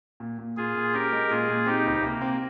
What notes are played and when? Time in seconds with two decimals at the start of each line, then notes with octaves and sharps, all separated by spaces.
0.20 A#2
0.38 A#2
0.57 A#2 F4 G#4
0.75 A#2
0.93 C#4 G4 A#4
1.12 G#3
1.30 A#2 F4 G#4
1.48 A#2
1.66 C4 D#4 G4
1.85 C#2
2.03 C3 A#3
2.21 C4